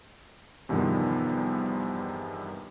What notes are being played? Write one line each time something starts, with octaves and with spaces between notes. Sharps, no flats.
E2 G2 C3 D#3 F3 B3